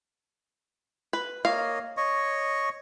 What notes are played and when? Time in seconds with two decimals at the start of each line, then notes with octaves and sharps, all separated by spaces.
1.13 B4
1.45 A#3 C#5 D#5 F5
1.97 C#5 D#5 C#6